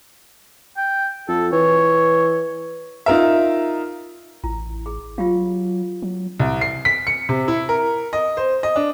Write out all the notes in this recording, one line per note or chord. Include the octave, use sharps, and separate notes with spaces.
G5
F2 A4
E3 C#5
D#4 F4 A#4 E5
A1 E4
G#4
F#3 F4 G4 F5
F#3
C2
C7
B6
C#7
C3
E4
A#4
D#5
C5
D#5
D4